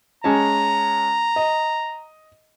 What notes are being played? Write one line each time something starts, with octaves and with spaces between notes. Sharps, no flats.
G#3 C#4 A5 A#5
D#5